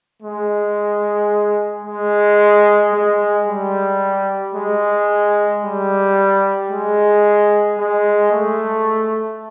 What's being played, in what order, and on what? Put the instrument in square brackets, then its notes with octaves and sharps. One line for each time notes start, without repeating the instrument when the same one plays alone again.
[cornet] G#3
G#3
G#3
G3
G#3
G3
G#3
G#3
A3